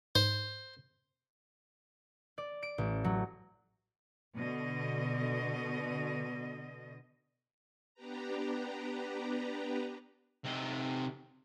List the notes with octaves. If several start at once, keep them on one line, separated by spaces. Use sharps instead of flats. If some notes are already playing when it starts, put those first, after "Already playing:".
G#2 C5
D5
D7
A1
F#3
B2 D3 D#5
B3 D4 G4 B4 A#5
C3 D#4